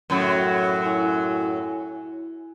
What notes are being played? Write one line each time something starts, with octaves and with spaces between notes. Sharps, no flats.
F#2 A2 F#3
E4 G#5